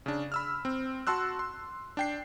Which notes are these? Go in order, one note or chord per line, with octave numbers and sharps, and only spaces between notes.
C#3 D4
B5 E6 F6
C4
F#4 A5 C6 E6 F#6
C6
D4 G5 C7